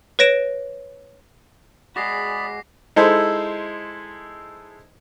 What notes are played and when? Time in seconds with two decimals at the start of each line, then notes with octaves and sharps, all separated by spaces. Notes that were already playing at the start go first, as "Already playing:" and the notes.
0.19 B4 C#5 A#6 D7 E7
1.96 G#3 F#4 G#4 D5 B5 D6 A#6 C7
2.96 G#3 D#4 E4 A4 C5